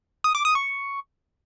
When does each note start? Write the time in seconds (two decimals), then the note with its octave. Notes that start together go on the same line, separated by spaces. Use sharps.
0.24 D#6
0.35 D6
0.45 D#6
0.55 C#6